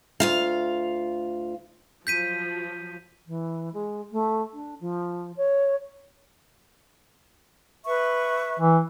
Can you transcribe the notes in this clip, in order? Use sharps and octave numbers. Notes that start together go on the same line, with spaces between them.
D2 F4 F5
F3 F#3 G6 B6 D#7
E3
G#3
A3
D4
F3
C#5
B4 E5 C#6
E3